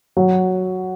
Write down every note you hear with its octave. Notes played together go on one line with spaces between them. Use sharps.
F#3